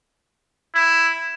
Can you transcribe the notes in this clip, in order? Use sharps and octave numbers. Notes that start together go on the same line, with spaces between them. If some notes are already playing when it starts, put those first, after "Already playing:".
E4